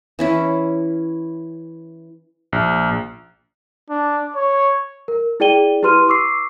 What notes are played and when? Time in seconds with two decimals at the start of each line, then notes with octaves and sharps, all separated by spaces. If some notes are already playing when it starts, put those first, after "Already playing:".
0.19 E3 C#4 E4
2.52 A#1
3.90 D4
4.36 C#5
5.08 A#4
5.40 E4 G#4 D5 G5 D#7 G7
5.83 E4 G4 B4 C6 F6 D#7
6.08 C#6 D6 E6 C7